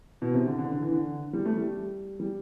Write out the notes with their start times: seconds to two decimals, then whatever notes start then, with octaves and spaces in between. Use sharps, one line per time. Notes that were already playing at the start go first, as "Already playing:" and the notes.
0.22 B2
0.34 C3
0.46 D3
0.58 D3
0.71 D3
0.82 E3
0.92 D3
1.33 G3
1.45 A3
1.57 G3
2.20 G3